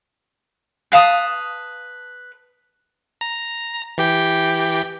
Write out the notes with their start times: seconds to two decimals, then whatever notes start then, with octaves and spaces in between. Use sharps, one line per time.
0.92 B4 F5 A5 D#6
3.21 A#5
3.98 E3 G4 G5